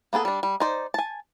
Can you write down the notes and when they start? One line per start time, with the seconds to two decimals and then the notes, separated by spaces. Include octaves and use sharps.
0.13 A#3 B3 G#4 A4
0.25 G3 D4
0.43 G3
0.60 D#4 C5 D5
0.94 G#5 A5